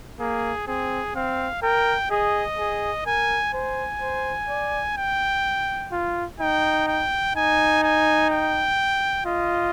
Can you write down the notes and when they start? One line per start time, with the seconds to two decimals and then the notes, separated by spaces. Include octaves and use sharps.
0.20 A#3 G#4
0.67 C4 G#4
1.15 C4 F5
1.62 A#4 G5
2.11 G#4 D#5
2.58 G#4
3.06 A#4 G#5
3.53 C5 G#5
4.01 C5
4.49 D5
4.97 G5
5.92 F4
6.40 D#4 G5
6.88 G5
7.36 D#4 G#5
7.83 G#5
8.30 G5
9.26 F4 D#5